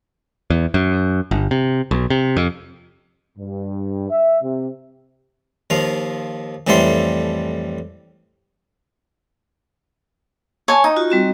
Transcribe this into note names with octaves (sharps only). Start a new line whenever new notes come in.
E2
F#2
G1
C3
B1
C3
F2
G2
E5
C3
D#2 F3 F5
F2 A2 E3 G3 A4 C6
C#5 G#5 A5
D#4 D#6
F4 F#4
G3 C4 F#4